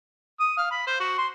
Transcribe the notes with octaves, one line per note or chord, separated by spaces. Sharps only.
D#6
F5
B5
C5
F#4
C6